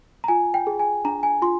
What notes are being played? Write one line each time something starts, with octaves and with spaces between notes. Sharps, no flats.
A#5
F4 G#5
G5
G#4
G#5
D4 A#5
G#5
F4 C6